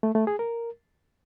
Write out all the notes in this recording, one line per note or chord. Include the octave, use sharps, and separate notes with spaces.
A3
A3
G#4
A#4